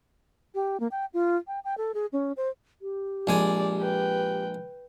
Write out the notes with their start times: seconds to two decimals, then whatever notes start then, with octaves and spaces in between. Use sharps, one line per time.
0.55 G4
0.80 A#3
0.91 G5
1.14 F4
1.47 G5
1.64 G5
1.77 A4
1.94 G#4
2.13 C#4
2.37 C5
2.82 G4
3.27 A#1 G#3 D5 G#5
3.81 B4 G5